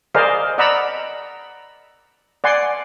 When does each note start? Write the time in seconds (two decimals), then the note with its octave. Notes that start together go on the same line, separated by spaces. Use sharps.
0.15 G#4 A#4 C5 D5 D#5 F5
0.58 D5 D#5 F#5 A#5 B5 E6
2.44 D5 F#5 G#5 C6